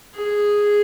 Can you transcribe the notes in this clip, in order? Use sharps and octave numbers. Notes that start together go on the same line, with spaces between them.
G#4